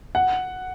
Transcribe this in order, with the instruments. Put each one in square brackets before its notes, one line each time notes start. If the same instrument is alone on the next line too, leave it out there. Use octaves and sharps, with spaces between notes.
[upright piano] F#5